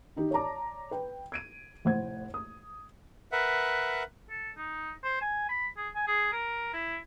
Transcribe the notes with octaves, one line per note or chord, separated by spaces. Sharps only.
D#3 D#4 G4
C#5 D5 A5 A#5 D6
B4 G5
G#6 D7 D#7
F1 A2 C5 F#5 G#6
D#6
A#4 B4 E5 F#5
A4
D#4
C5
G#5
B5
G#4
G#5
G#4
A#4
E4